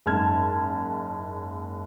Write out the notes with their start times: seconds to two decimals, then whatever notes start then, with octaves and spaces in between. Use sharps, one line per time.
0.06 F#1 G#2 A5 F6 G#6